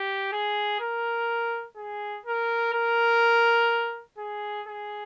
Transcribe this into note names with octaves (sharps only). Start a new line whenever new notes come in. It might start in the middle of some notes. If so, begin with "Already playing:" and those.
Already playing: G4
G#4
A#4
G#4
A#4
A#4
G#4
G#4